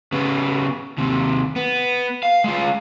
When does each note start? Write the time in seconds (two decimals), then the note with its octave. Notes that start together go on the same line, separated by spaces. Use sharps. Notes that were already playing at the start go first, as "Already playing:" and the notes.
0.12 C#3 B3
0.98 D#2 C3
1.56 B3
2.23 F5
2.44 G#3 F4